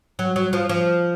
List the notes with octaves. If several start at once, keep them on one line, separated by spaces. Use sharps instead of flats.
F#3
F#3
F3
F3